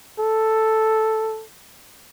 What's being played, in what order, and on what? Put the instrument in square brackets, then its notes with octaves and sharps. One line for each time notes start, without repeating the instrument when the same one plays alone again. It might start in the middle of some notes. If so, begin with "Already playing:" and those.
[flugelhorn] A4